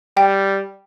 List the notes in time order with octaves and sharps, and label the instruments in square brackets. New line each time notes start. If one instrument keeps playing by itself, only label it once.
[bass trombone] G3 [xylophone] G5